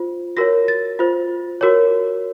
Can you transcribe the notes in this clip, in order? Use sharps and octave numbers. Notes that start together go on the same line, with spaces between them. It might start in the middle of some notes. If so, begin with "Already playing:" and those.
Already playing: F4 C5
F#4 A#4 C#5 A#6
A6
F4 C5
F#4 A#4 C#5